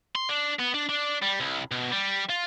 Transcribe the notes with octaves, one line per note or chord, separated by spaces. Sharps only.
C6
D4
B3
D4
D4
G3
C2
B2
G3
F4